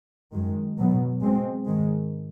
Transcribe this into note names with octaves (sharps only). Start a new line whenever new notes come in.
F#2 D#3 G#3
B2 F#3 B3
B2 G#3 C4
G#2 D#3 G#3